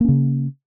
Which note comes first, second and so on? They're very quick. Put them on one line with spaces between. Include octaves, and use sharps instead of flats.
A#3 C#4 C#3